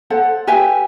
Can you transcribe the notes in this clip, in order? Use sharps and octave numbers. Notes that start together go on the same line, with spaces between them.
A4 C5 F#5
G4 B4 E5 G#5